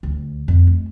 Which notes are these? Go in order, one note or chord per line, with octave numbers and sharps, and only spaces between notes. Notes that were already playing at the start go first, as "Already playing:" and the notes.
D2
F2
A3